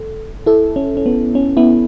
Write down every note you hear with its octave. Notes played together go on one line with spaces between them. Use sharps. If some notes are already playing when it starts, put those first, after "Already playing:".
Already playing: A4
E4 A4
C#4
C#4
B3
C#4
B3 E4